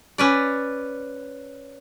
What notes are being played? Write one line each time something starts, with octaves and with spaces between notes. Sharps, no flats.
C#4 B4 D5